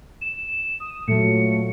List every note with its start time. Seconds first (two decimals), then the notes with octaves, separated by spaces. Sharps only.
0.21 E7
0.80 D#6
1.08 A#2 F#3 A3 C#7